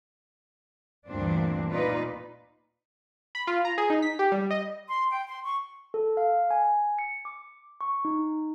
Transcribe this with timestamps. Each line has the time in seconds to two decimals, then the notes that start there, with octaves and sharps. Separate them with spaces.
1.07 D2 G2 A#2 E3 C4 D4
1.70 A#2 D#4 F4 B4 D5
3.35 B5
3.47 F4
3.65 A#5
3.78 G#4
3.90 D#4
4.02 B6
4.19 G4
4.32 G3
4.51 D#5
4.89 C6
5.10 G5
5.28 C6
5.44 C#6
5.94 A4
6.17 F5
6.51 G#5
6.99 C#7
7.25 D6
7.81 C#6
8.05 D#4